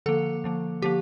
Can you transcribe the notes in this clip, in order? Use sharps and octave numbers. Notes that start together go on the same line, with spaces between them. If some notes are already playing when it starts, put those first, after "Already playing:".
D3 F3 A#3 A4
D3 F3 A#3
D3 F3 A#3 G4